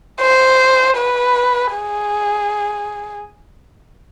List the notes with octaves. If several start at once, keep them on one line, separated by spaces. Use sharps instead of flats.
C5
B4
G#4